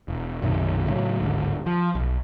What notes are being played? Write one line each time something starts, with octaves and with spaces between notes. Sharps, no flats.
E1
B1 F#2 C3 D#3
A2 C#3 E3 F#3
D1 G#1 G#2 D3
F3
B1